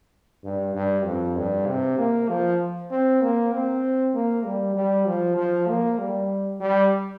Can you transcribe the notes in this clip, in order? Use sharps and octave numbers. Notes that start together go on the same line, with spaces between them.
G2
G2
F2
G2
C3
A#3
F3
C4
A#3
C4
A#3
G3
G3
F3
F3
A#3
G3
G3